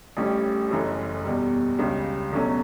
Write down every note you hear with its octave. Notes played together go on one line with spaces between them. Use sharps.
A1 A2 G3 C#4
F#1 F#2 E3 A3
E2 B2 G3
C#2 C#3 G3
E2 B2 F#3 A3 C#4